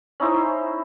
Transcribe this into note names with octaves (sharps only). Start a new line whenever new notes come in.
C#4 D#4 E4 C5